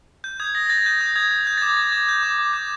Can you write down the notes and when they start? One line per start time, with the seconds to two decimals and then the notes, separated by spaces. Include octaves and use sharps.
0.24 G6
0.40 D#6 G#6
0.55 D#6 A#6
0.66 A#6
0.70 G6 A6
0.86 G6
1.01 D#6
1.16 D#6 G#6
1.31 G6
1.47 G6
1.58 A6
1.62 D6 G#6
1.77 D6 A6
1.92 G6 G#6
2.09 G6
2.23 D6
2.38 D6
2.53 G6